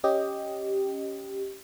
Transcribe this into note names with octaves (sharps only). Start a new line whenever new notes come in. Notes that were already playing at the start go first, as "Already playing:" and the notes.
C#4 G4 D#5